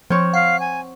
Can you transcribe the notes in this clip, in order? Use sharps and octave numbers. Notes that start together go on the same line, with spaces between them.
F3 C4 C#5
F5 F#5
G#5